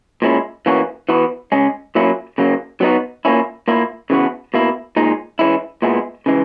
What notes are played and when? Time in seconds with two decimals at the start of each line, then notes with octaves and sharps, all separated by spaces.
0.22 A#2 G#3 C#4 E4
0.66 E3 A#3 C#4 F#4
1.09 E3 B3 F#4
1.52 C#3 G#3 C#4
1.95 A#2 F#3 A#3 C#4 E4
2.38 C#3 F#3 A#3
2.81 F#3 B3 D#4 F#4
3.25 A#2 A#3 C#4 E4
3.68 A#2 A#3 E4
4.10 C#3 E3 B3 F#4
4.54 B2 A#3 E4
4.96 A#2 G#3 D#4
5.39 E3 G#3 C#4 E4
5.82 A#2 G#3 B3 E4
6.26 C#3 E3 G#3